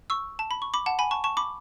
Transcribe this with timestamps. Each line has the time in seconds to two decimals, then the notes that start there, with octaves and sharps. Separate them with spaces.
0.10 C#6 E6
0.39 A5
0.51 B5
0.62 C#6
0.74 B5 D6
0.86 F#5 A5
0.99 G#5 B5
1.11 A5 C#6
1.24 A5 C#6
1.37 B5 D6